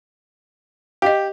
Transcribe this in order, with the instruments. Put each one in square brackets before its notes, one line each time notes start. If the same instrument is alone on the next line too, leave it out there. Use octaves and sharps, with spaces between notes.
[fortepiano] G4 [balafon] D#5 F5